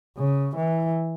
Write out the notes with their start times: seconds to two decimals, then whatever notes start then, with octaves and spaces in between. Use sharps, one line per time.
0.18 C#3
0.56 E3